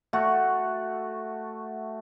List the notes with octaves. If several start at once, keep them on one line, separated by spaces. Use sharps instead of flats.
A3 F#4